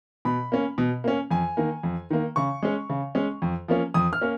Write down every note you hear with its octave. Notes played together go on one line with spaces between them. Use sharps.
B2 B5
A#3 C#4
B2
A#3 C#4
F2 G#5
D#3 A#3
F2
D#3 A#3
C#3 C#6
G#3 C#4
C#3
G#3 C#4
F2
F3 A#3 C#4
F2 D#6
F6
A#3 C#4